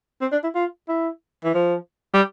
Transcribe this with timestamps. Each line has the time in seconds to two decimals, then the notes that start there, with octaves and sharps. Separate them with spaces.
0.22 C4
0.32 D4
0.44 E4
0.55 F4
0.89 E4
1.44 E3
1.55 F3
2.14 G3